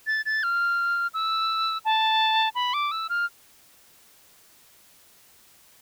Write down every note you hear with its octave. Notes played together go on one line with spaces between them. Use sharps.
A6
A6
F6
E6
A5
B5
D6
E6
F6